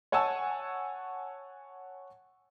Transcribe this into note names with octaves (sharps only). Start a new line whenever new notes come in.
C#5 F#5 G#5 A5 E6